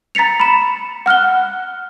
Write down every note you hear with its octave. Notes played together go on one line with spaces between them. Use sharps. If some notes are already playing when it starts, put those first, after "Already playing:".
A#5 A6 B6 C#7 F7
B5 E7
F#5 F6 F#6 G7